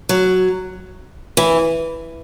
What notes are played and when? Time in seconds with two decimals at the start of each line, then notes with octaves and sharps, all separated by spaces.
0.09 F#3
1.37 E3